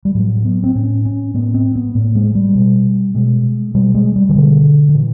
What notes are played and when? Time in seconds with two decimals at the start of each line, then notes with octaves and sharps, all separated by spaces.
0.05 G3
0.15 A2 F#3
0.45 B3
0.64 C4
0.75 A2 C#4
1.05 C#4
1.34 A2 B3
1.54 C4
1.75 B3
1.95 A2 A#3
2.15 G#3
2.35 G3
2.55 B2
3.15 B2 G#3
3.75 B2 G3
3.95 G#3
4.16 G3
4.29 D#3
4.35 B2 D3
4.89 D#3
4.95 A#2 E3